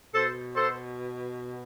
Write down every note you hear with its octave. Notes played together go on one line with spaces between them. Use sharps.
B2 A4 C5
A4 C5